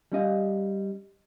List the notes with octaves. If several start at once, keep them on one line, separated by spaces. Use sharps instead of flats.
G3 C#4 D#5 F5